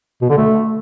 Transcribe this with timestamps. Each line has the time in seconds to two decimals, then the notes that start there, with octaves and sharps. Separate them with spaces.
0.22 B2
0.30 D3
0.38 A3